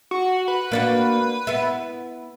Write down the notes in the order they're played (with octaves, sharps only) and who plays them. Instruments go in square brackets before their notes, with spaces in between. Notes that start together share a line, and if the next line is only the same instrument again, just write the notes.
[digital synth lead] F#4
B4
[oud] A#3 D4 F#4
B3 E4